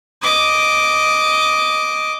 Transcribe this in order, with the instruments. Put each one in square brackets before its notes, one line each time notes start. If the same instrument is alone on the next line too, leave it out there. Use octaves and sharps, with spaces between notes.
[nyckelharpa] D#5 D6